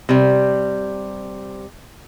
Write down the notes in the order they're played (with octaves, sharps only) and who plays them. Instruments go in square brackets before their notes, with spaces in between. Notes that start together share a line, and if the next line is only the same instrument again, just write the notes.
[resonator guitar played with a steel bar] C3 G3